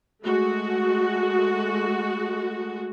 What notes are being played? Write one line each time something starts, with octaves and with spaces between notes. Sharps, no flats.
G#3 A3 F#4